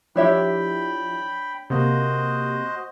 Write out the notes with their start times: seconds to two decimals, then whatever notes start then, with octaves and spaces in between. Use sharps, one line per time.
0.16 F3 D4 E4 G4 C#5 E5 G5 B5
1.70 C3 A#3 F#4 C5 D#5